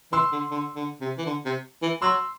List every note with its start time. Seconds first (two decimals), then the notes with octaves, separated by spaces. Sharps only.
0.12 E3 C6 E6
0.32 D3
0.51 D3
0.76 D3
1.01 C3
1.18 E3
1.26 D3
1.45 C3
1.83 E3
2.02 F#3 C6 E6